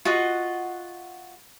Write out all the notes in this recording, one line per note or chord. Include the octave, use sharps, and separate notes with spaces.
F4 F#4 D#5 F#5